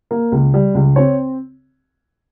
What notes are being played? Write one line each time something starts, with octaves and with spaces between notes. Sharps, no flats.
A#3
C#2
G3
C#2
C4 C#5